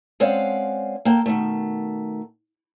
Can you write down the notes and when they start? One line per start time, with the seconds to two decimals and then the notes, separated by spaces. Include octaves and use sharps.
0.20 G#3 C4 C#4 D5 F5 F#5
1.05 A#3 A4 G5
1.26 B2 D#3 A3